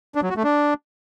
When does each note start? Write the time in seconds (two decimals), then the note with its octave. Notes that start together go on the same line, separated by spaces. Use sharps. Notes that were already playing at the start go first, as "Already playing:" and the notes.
0.15 D4
0.22 F#3
0.29 F#4
0.37 A3
0.44 D4